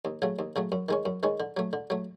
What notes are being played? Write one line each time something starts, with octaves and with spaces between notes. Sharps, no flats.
D#2
C#3 F#3 A3
D#2
C#3 F#3 A3
F#2
D#3 G#3 C#4
F#2
D#3 G#3 C#4
D3
F#3 A3
D3
F#3 A3